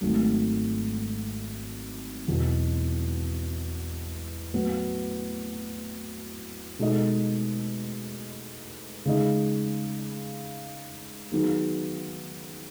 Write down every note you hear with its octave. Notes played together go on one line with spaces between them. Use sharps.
G#1 G#2 F#3 A3
E2 B2 F#3
A2 F#3 B3
B2 G#3 D#4 A4 D#5
C#3 G#3 D#4 G#4 D#5
D#3 F#3 B3 D#4 G#4